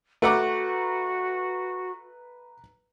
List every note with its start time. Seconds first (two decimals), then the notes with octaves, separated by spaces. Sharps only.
0.22 A3 F#4 B4 F#5 A#5 D6